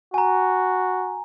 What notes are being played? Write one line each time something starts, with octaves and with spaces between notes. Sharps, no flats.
F#4 G#5 A#5